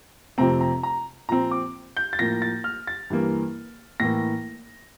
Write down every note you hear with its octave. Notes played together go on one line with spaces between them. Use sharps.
F2 C3 F3 A3 C4 A#5
A#5
A#5
A#2 F3 C4 A#5
D6
G6
A6
A2 F3 A#3 A#6
A6
F6
A6
G2 E3 A#3
A2 E3 A#3 A#6